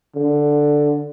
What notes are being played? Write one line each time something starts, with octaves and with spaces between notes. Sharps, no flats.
D3